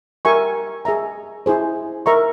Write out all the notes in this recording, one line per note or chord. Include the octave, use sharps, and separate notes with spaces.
G4 A#4 E5 G#5 C#6
G#4 E5 A#5
E4 G#4 C5
A#4 E5 A#5 C#6